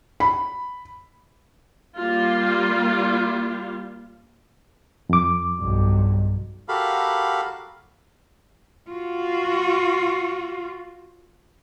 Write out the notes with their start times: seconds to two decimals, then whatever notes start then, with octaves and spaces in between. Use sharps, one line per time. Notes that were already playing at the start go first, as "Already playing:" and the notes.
0.20 B5
1.97 G3 A#3 F4
5.09 F2 D6
5.58 B1 G2
6.69 F#4 G4 A4 A#4 F5 B5
8.90 F4 F#4